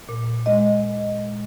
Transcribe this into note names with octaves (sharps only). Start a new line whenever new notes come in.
A#2
G#3 D#5